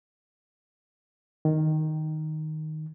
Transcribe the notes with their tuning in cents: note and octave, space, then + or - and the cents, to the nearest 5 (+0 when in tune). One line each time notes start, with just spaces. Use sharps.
D#3 +0